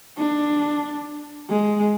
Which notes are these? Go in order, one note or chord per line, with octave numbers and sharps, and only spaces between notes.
D4
G#3